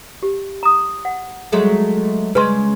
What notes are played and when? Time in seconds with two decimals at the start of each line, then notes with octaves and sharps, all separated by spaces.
0.23 G4
0.63 A#5 D#6
1.05 F#5
1.52 F#3 G#3 A3
2.35 C#3 G#3 B4 C6